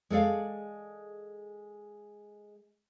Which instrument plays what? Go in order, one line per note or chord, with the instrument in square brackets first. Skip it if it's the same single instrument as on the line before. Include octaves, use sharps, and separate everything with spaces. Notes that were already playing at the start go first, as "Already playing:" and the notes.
[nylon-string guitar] G#3 A4 D5 F5